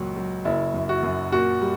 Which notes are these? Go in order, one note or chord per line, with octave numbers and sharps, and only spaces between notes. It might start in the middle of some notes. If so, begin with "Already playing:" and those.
Already playing: C#2 A#2 F#3
F#3
F#1 E4
F#2
F#4
F#2
A#2 F#4
G3